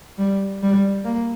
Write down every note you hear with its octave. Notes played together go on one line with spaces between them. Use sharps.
G3
G3
A#3